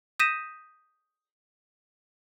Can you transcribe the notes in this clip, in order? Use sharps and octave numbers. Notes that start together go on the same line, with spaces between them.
D#6 G6 A#6 B6 D#7 E7